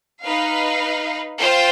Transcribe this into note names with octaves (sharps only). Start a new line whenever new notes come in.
D#4 B4 F5
F4 C5 G5